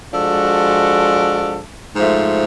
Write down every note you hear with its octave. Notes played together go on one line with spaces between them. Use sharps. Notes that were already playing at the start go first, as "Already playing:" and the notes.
F3 G#3 D4 F#4 A4
G#2 F3 A3